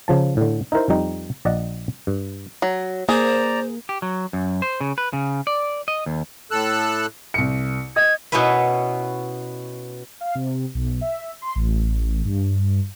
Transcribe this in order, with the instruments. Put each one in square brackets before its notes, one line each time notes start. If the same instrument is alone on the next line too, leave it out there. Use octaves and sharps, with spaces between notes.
[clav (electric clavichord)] C#3 F3 A5
A2 D3
D#4 E4 A#4 C5
F2 G3 D#4
A#1 D5 D#5 F#5
G2
[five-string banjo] F#3
[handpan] A#3 [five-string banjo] G#4 [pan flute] C5 [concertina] D5 A#5
[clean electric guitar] G4
F#3
F#2
C5
C#3
B4
C#3
D5
D#5
D#2
[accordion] A2 A4 E6 F#6
[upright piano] C2 C#7
[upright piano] D#5 [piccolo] G#6
[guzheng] B2 B3 C#4 E4 B4
[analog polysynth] F5
C3
B1
E5
C6
A1
G2